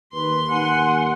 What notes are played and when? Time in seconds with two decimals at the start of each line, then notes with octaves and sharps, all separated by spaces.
0.13 D#2 B4 C6
0.50 D#2 F#5 G#5